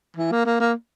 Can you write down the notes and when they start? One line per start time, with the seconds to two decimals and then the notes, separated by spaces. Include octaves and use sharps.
0.16 E3
0.31 A#3
0.46 A#3
0.60 A#3